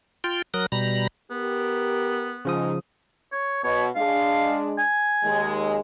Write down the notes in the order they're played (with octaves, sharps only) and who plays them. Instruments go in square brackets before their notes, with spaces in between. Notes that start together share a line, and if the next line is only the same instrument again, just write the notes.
[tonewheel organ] F4 G5
F#3 A#4 D#6 F#6
B2 G3 A#5 B5 A#6
[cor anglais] B3 [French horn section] G4 A#4
[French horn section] G#2 [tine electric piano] C#3 F3 D#6
[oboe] C#5
[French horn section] B2 [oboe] C#5
[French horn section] G#3 D4 [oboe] F5
[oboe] G#5
[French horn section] D#2 G#3